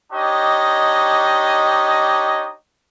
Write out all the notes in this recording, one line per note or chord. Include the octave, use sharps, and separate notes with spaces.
D4 D#4 G4 C#5 D#5